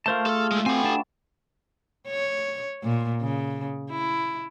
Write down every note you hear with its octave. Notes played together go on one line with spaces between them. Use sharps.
A3 F4 A#4 C5 A5
G#4 A4 F6
G#3 A3
C4 F#4 G4 A4 B4 G#5
D4 A5
C#5
A#2
C#3
E4